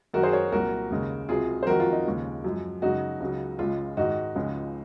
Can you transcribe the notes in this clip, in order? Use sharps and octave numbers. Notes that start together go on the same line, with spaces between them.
F#2 D#3 F#3 F#4 A#4
G#4 C5
A#4 C#5
C2 A#2 F#3 F#4 A#4
D#2 C#3 G#3
C#2 C3 F#3 F4 G#4
C5
F2 D#3 F#3 F#4 A#4
F4
D#4
D#2 C#3 F3 G#3
F#2 F3 G#3
F#2 C#3 G#3 D#4 F#4
C#2 C#3 F#3
C#2 C#3 G#3 F4
G#2 D#3 G#3 D#4 F#4
C#2 C#3 F3 G#3